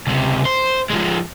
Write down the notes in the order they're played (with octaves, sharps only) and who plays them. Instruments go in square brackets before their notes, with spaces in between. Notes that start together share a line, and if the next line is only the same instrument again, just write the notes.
[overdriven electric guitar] C#2 C3
C5
F3 G#3